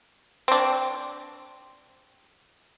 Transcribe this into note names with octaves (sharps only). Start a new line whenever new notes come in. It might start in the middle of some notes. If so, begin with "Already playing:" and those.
C4 D4